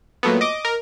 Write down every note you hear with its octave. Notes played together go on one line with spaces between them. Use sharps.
A#2 F#3 A3 B3
D#5 D6
A#4